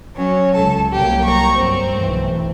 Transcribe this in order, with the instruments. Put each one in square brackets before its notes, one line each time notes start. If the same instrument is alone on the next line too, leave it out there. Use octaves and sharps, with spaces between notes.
[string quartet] F#3 C#4
[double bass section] C#2 [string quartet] A4
[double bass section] C2 F#3 A#3 [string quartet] G4 G5
[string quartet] A#5 C#6
[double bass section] G1 F#2 F#3 [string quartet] C4
[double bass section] B1 E3 A3